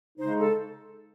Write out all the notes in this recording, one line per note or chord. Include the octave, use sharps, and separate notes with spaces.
C#3 G#3 D#4 C5
A4